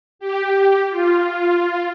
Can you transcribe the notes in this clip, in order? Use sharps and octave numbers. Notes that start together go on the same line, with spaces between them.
G4
F4